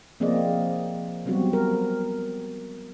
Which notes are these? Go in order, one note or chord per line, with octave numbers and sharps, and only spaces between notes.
F3 A#3 C4 G#4 D5 D#5
F#3 G3 B3 C4 F#4
A#4